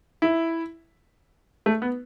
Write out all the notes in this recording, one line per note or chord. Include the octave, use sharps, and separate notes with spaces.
E4
A3
B3